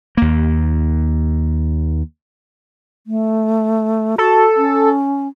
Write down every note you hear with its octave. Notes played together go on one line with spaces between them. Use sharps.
D#2 A#3
A3
F#4 A4
C#4